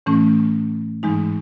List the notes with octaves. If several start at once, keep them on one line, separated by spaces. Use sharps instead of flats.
A2 E3 A3 C#4
G#2 E3 G#3 D#4